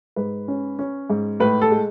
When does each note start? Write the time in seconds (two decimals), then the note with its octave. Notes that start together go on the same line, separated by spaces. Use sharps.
0.16 G#2 B4
0.48 C#4
0.79 C#4
1.10 G#2
1.40 A2 B4
1.61 A4
1.71 G#3